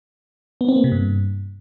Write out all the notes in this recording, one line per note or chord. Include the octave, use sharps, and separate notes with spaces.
B3
C4
A#3
C3
G2